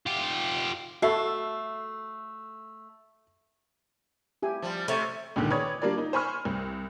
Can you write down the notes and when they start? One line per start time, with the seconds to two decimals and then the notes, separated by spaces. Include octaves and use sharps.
0.06 F4 G4
1.02 A3 F#4 A4 E5 C7
4.42 E4 G4 G#5
4.62 F3 G3
4.88 C3 A3 C#4
5.36 C#2 A#2 D3 D#3
5.50 B4 C#5 D5 D#6 G#6
5.82 G3 A#3 D4 F4 A#4 D5
5.98 D#4
6.13 C5 G#5 B5 C#6 F6
6.45 C2